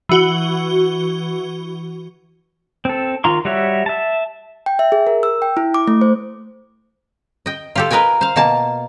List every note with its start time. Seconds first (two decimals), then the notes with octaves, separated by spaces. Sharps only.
0.09 E3 F#4 G7
2.85 C4 A4
3.24 D#3 F4 A#5 C6 C#6
3.45 G3 F#4 C#5 E5
3.86 E5 A5
4.66 G5
4.79 E5
4.92 G#4
5.07 A#4
5.23 E6
5.42 G5
5.57 E4
5.74 D6
5.87 A3
6.01 C5
7.46 D#5 G5
7.76 F4 G4 A4
7.91 A#4 B4 D#5 G5 G#5
8.21 C5 F5
8.36 B2 A#3 A5